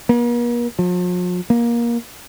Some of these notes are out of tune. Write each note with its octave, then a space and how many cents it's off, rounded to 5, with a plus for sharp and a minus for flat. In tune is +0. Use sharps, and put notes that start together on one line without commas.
A#3 +45
F3 +45
A#3 +20